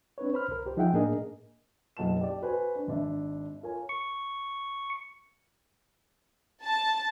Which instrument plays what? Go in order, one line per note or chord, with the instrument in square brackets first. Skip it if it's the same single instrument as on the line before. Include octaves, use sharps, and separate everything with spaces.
[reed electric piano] C4 D4 B4 C#5
C5 B5 F6
C2 A#4
C2 G4 C5
F3 D#4 G#4 E5 F#5 G5
A2 A#3 D4 G#4 A#4 D#5
[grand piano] F#1 B1 F#5 A5 E7
G4 D5
F#4 B4 C5 G#5
D4
G#1 D4 E5
F4 A#4 C#5 G#5
[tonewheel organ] C#6
[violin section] A5